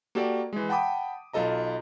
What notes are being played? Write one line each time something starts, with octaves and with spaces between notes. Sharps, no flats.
A#3 F#4 G4 A4 D5
E3 G#3
F#5 G5 A5 B5 D6 D#6
B1 F4 A4 D#5 A#5